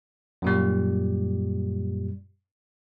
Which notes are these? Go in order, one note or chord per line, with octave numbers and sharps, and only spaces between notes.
F#2 A#2 G3